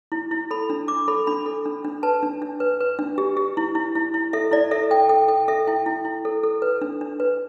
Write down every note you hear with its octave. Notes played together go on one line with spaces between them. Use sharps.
E4
E4
A4 B5
D4
D4 D6
A4 B5
D4 B5
A4
D4
D4
B4 A5
D4
D4
B4
B4
D4
G4
G4
E4
E4
E4
E4
A4 E5
E4 D5
A4 E5
A4 G5
A4 G5
A4 G5
A4 E5
E4 G5
E4
E4
A4
A4
B4
D4
D4
B4